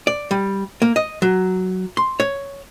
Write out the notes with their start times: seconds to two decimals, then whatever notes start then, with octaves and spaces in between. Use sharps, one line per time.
0.07 D5
0.31 G3
0.82 A#3
0.96 D#5
1.22 F#3
1.97 C6
2.20 C#5